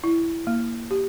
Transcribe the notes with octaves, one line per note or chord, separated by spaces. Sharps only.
E4
A#3
G4